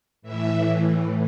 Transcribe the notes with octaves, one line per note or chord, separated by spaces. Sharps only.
A2 E3 E5